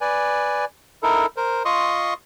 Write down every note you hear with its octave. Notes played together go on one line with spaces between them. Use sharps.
B4 D5 G#5
D#4 E4 A4 A#4
A#4 C5
F4 D#5 C6 C#6 D#6